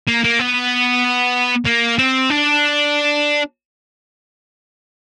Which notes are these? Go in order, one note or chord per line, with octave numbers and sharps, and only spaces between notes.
A#3
A#3
B3
A#3
C4
D4